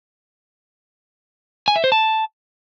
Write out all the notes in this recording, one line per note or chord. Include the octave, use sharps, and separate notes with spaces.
G#5
E5
C5
A5